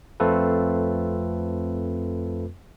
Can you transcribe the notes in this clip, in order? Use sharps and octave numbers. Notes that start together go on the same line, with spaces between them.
F2 A3 C4 F4 A4 B4